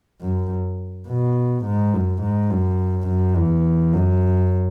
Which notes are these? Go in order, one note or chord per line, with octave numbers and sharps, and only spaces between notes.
F#2
B2
G#2
F#2
G#2
F#2
F#2
E2
F#2